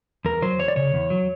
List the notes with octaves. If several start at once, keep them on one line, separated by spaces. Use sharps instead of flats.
E2 A#4
F#3 C5
E2 C#5
D5
C#3 C#5
E2
F#3